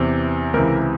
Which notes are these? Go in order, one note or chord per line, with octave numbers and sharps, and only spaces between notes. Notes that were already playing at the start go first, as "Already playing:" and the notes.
Already playing: E2 C3 E3
C#2 C3 E3 A#4